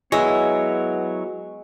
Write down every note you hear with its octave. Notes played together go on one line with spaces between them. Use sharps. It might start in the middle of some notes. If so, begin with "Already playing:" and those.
F#3 G#3 B3 E4 C#5